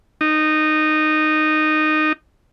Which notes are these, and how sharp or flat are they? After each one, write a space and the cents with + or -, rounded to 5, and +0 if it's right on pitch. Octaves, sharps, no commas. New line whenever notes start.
D#4 -15